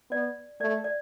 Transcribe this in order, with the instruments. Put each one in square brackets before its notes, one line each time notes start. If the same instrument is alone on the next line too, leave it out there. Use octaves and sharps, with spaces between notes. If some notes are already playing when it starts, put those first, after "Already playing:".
[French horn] B3 [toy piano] D5
[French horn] A3 [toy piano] D5
[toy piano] D5